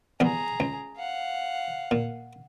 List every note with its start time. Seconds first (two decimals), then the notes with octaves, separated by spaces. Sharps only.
0.20 E2 G3 B3 G#4 A#5
0.60 C#2
0.96 F5 F#5
1.91 A#2